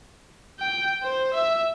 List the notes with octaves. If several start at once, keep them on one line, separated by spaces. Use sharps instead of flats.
G5
C5
E5